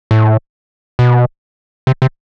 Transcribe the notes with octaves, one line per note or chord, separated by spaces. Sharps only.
A2
B2
C3
C3